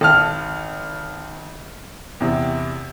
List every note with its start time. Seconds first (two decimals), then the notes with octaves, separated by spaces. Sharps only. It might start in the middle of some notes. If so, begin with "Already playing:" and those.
0.01 G#1 A5 F6
2.20 E2 C3